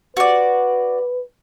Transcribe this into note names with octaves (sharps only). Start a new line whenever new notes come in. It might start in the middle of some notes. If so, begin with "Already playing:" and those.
F#4 B4 D5